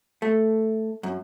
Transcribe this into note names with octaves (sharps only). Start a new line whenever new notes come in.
A3
F#2